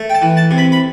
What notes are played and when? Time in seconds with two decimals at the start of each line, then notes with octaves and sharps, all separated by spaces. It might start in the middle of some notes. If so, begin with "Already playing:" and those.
Already playing: A3
0.10 G5
0.15 A5
0.22 E3
0.37 A5
0.51 C3
0.58 B5
0.72 B5